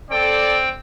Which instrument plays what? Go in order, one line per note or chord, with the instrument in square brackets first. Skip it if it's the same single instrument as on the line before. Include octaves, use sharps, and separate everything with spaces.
[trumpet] C4 [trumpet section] A4 D5 [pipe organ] G5